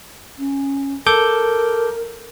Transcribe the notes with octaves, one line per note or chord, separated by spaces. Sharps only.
C#4
A4 A#4 D6 G6